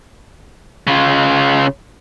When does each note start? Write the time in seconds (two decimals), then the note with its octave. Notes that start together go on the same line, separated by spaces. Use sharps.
0.87 C#3 F4